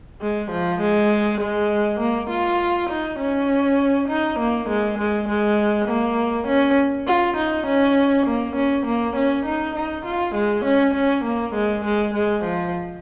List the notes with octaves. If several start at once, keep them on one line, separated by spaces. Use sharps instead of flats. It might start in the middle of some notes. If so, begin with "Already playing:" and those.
G#3
F3
G#3
G#3
A#3
F4
D#4
C#4
D#4
A#3
G#3
G#3
G#3
A#3
C#4
F4
D#4
C#4
A#3
C#4
A#3
C#4
D#4
D#4
F4
G#3
C#4
C#4
A#3
G#3
G#3
G#3
F3